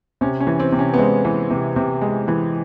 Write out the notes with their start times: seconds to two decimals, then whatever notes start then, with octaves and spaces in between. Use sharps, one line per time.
0.21 C3 C#4
0.40 C#4
0.47 E3
0.60 C4
0.72 C3
0.79 C#4
0.94 B3
0.98 G#3 C4
1.25 E3
1.50 C3
1.76 C3
2.02 G#3
2.28 E3